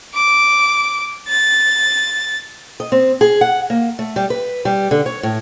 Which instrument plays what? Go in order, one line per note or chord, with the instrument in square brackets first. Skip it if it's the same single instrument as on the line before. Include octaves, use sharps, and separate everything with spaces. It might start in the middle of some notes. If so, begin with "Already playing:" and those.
[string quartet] D6
A6
[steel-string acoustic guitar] D#5
C4
G#4
F#5
A#3
A3
G3
B4
G3
D3
C#5
A2